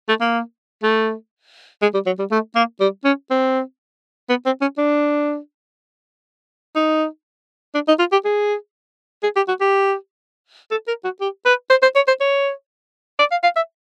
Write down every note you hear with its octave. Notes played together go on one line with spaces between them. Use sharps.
A3
A#3
A3
G#3
G3
F#3
G3
A3
A#3
G3
C#4
C4
B3
C4
C#4
D4
D#4
D4
D#4
F4
G4
G#4
G#4
G4
F#4
G4
A4
A#4
F#4
G4
B4
C5
C5
C#5
C5
C#5
D5
F5
F5
E5